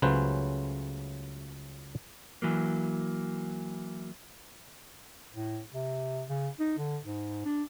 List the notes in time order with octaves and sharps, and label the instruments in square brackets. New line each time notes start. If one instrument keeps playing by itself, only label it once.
[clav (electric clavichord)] C#2 C#3 F#3 A3 B4 C5
[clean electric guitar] E3 F#3 A#3
[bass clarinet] A2
C3
C#3
D#4
D3
G#2
D4